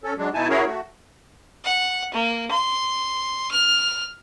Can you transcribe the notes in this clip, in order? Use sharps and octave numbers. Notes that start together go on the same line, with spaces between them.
C#4 A4
F#3 G#3 D4
B2 D#4 E4 G#5 A5
C#4 E4 F#4 G#4 A#4 C#5
A3 F#4
F#5
A#3
C6
F6